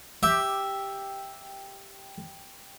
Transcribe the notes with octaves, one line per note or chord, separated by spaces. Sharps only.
G4 E5